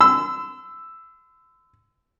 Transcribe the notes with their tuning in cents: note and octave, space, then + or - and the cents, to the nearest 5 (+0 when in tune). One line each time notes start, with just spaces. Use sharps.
C6 -45 E6 +0